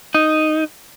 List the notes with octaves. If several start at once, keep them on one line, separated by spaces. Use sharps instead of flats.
D#4